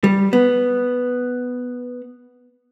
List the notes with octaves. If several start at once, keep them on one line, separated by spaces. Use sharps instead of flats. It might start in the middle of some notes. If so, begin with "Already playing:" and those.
G3
B3